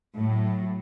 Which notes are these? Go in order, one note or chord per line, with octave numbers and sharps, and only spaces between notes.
A2 F#3